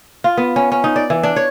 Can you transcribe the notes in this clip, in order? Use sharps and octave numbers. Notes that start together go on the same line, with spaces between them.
F4
B3
C#4
C#4
D#4
D5
E3
D4
C#5